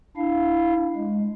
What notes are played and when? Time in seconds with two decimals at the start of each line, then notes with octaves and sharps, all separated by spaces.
0.17 D4 E4 F5
0.96 G#3